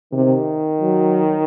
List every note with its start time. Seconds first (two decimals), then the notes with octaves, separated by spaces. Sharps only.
0.12 C3 D#3
0.81 F#3